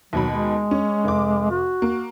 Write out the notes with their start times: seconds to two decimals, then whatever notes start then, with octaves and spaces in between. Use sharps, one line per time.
0.13 D#2 B2 F#3 B5
0.32 G#3
0.71 C#4
1.04 F1 D6
1.51 F#4
1.82 A#3